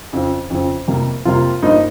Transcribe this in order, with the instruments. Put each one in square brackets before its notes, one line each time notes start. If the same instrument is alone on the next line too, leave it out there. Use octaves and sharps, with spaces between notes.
[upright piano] F2 C#3 F3
F2 C#3 F3
F2 C3 G3 A#3
F2 C3 G3 A#3 F4
G2 F3 A#3 D#4